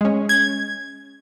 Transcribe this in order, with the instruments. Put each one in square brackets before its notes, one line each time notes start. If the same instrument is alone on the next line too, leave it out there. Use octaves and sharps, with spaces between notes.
[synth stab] G#3 C#4
[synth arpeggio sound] G#6